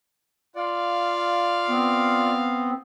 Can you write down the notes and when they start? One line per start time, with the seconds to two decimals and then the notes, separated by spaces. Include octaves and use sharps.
0.56 F4 D5 F5
1.69 B3 C4